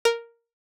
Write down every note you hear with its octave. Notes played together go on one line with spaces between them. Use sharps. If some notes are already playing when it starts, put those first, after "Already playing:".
A#4